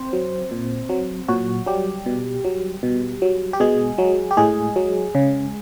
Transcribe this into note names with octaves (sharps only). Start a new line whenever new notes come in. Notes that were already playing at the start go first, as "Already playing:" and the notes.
Already playing: C4 C5
F#3
A#2
F#3
A#2 F#3 F#4
F#3 G3 G4
B2
F#3
B2
F#3
G4
B2 G#3 G#4
F#3
G4
A2 G#3 G#4
F#3
C#3